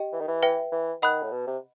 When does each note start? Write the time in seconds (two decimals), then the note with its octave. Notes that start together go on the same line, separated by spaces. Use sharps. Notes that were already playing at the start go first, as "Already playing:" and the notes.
Already playing: G4 D#5 G5
0.12 E3
0.20 D#3
0.28 E3
0.43 B4 E5 G5
0.72 E3
1.02 D#3 D#5 F#5 B5 D#6 F#6
1.22 A2
1.32 B2
1.47 C3